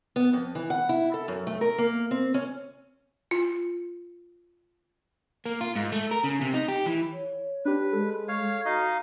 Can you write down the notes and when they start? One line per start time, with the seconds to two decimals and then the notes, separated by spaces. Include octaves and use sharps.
0.16 B3
0.33 F2
0.55 E3
0.70 F#5
0.89 E4
1.14 A4
1.28 F#2
1.47 A3
1.61 A#4
1.78 A#3
2.11 C4
2.34 C#4
3.31 F4
5.46 A#3
5.61 F4
5.76 G#2
5.92 A3
6.11 A#4
6.24 C#3
6.41 C3
6.54 D#4
6.68 G4
6.86 E3
7.12 C#5
7.65 D4 G4 B4
7.93 G#3 A4
8.28 C#5 F5
8.66 D#4 F#4 D#5 F5